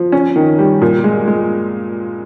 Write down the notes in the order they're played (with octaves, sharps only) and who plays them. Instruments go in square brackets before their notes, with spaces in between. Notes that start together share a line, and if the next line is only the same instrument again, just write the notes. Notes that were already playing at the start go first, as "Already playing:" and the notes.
Already playing: [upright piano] F3
C#4
D#3
G3
A#2
G#3
G#3